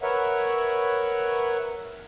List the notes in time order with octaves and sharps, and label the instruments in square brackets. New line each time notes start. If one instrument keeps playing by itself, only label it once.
[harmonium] A#4 B4 C#5 E5 F#5